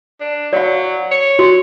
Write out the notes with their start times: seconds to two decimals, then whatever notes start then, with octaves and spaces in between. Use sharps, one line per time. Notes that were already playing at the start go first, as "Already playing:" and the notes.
0.21 D4
0.53 F#3 D5 F5
1.12 C#5
1.39 F#4